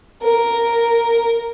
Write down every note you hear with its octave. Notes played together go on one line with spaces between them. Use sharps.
A#4